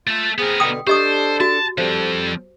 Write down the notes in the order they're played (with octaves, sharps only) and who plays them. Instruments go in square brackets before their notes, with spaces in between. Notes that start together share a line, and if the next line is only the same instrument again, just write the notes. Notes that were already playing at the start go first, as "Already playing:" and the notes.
[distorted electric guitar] A3 A4 [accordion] F4
[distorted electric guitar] B3 A#4 [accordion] C4 G#4
[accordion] B2 D3 [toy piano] G5 D#6
[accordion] D4 A4 [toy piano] G4 D#5 D#6 [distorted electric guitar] C5
[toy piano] F#4 [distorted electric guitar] A5
[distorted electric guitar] F3 C4 [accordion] G3 A4 [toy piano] C5